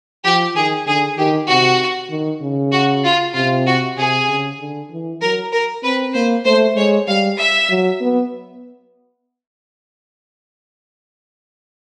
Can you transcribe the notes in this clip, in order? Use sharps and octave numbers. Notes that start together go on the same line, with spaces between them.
F3 G4
D#3 G#4
D3 G#4
D#3 G4
C3 F#4
D#3
C#3
F#4
F4
C3 F4
F#4
C3 G#4
C#3
D3
E3
F#3 A#4
A#4
C4 B4
A#3 C5
A3 C5
G#3 C#5
G3 F5
E5
F#3
B3